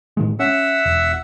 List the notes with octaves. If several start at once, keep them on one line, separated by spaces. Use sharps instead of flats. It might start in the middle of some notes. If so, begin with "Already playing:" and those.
A2 D#3 G#3
C#4 E5 F#5 E6
E1